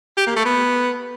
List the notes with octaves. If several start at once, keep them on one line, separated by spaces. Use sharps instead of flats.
G4
A#3
A3
B3